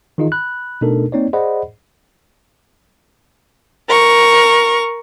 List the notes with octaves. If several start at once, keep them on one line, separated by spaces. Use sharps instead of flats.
D#3 E3 D#4 F4 G#4 D#5
B5 F#6
B2 A3 D4 D#4 A4 A#4
A#3 C4 D#4 C#5 D5
G#4 C5 D5 D#5 F#5 B5
A#4 C#6